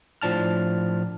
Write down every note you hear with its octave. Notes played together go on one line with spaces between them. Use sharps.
A2 F3 D4 A5 F6